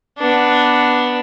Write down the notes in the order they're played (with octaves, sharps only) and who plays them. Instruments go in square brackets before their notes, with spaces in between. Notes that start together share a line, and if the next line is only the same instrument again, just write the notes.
[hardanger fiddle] B3 D4